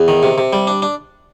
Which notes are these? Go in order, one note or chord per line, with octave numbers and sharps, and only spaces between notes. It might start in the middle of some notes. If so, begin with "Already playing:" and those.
Already playing: E2
D#3
C3
C3
G3
D4
D4